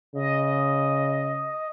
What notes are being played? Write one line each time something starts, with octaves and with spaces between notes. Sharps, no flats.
C#3 D#5